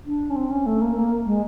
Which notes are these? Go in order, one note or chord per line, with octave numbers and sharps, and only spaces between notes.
D4
C#4
C4
C#4
A3
A#3
A#3
G#3